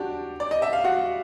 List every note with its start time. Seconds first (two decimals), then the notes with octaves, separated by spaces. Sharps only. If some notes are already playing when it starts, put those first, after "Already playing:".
Already playing: D4 F#4 G4
0.40 D5
0.51 D#5
0.62 E5
0.73 F5
0.84 F#4 F#5